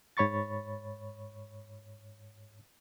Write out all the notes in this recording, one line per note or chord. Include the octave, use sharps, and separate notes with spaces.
G#2 C#5 B5 C#6 A6